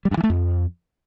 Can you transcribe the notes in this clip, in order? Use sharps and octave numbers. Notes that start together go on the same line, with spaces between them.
G3
G2
E3
A3
F2